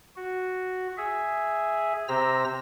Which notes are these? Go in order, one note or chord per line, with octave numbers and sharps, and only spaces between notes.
F#4
G#4 E5
C3 C4 C5 A#5 E6 A#6